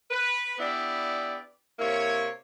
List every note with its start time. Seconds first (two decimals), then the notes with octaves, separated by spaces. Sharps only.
0.11 B4
0.58 B3 D4 E4 G4 D5
1.79 C3 A#3 E4 C#5